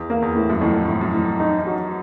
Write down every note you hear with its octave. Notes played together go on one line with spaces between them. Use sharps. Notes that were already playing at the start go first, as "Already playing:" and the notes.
Already playing: E2
A#3
E2
A2
F#2
F2 A2
A2
F#2
A2
D#4
F#3